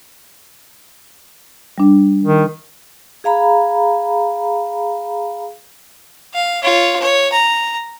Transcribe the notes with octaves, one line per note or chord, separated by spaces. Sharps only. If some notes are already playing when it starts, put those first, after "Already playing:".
G3 D4
D#3
G#4 F5 A#5 B5
F5
F4 C#5
C#5
A#5